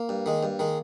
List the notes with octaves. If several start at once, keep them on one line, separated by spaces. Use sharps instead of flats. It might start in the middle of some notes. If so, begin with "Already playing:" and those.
Already playing: A#3
G2
D#3 G#3
G2
D#3 G#3